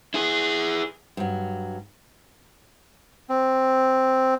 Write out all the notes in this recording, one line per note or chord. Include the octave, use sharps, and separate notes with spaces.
E4 G#4
G2 F#3
C4